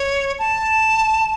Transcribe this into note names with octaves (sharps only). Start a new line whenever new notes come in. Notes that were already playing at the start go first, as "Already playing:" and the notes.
Already playing: C#5
A5